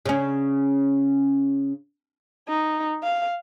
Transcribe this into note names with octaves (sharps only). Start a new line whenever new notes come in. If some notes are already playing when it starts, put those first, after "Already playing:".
C#3 C#4
D#4
F5